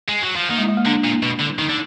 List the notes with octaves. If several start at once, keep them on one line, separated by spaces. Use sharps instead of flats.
G#3
F#3
F3
D#3 A#3
G#3
G#3
A#3
D3 D4
A#2
B2
D3
D#3 D#4
D3